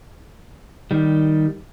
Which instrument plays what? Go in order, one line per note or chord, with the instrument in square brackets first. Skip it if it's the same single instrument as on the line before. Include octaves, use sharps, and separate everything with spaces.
[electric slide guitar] D#3 G3